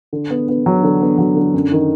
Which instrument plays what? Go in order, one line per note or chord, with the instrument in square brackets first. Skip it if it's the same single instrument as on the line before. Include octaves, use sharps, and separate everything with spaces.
[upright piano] D3
B3
B3
F#3
D3
B3
F#3
D3
F#2
D#3